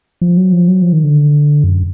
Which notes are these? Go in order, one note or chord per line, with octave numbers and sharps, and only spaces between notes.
F3
F#3
F3
F#3
F3
D#3
D3
F#2